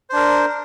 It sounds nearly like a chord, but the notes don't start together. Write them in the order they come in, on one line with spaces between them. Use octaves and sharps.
C5 D4 A#4